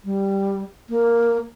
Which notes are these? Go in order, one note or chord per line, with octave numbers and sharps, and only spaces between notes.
G3
A#3